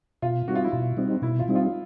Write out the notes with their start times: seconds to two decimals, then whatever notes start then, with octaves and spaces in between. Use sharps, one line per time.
0.22 B2 F4
0.48 G3 C4 D#4 F#4
0.55 F4
0.64 E4
0.72 B2 F4
0.97 G3 C4 D#4
1.22 B2 E4
1.39 F4
1.48 G3 C4 D#4
1.55 F4